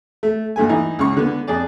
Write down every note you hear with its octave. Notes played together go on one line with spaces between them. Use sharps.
A3
D2 G2 A3 G#5
E3 D#4
C#2 C#3 C#6
D3 B3
F2 G#4 D5